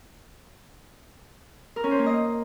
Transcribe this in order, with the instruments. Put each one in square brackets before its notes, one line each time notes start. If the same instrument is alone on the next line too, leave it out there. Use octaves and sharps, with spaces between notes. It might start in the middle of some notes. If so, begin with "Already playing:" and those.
[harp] A#4
C#4
C5
A#3
D#5